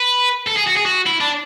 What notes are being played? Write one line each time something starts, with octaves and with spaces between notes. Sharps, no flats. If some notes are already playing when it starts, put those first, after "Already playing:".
Already playing: B4
A4
G#4
F#4
G#4
F#4
E4
D4